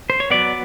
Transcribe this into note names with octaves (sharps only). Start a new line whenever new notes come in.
C5
C#5
F#3 B3 D5